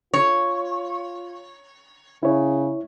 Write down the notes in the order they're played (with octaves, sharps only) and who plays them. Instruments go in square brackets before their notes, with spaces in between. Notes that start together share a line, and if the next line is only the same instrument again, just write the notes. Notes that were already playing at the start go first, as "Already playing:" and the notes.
[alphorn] F4 [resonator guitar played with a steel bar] C#5
[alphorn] C#3 [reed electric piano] E4 C#5